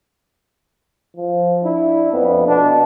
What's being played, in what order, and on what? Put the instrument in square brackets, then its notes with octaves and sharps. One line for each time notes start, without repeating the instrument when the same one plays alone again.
[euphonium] F3
[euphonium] D4 [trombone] E4
[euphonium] F2 [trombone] B3
[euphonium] B2 [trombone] D4